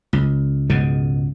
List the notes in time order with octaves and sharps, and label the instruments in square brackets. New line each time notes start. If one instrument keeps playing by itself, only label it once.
[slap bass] C#2
C#2 G#2 B2